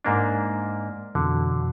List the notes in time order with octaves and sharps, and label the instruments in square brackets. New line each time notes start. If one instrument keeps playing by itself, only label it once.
[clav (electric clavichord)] G#2 A#3 D4
[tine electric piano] F2 B2 E3 [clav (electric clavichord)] D3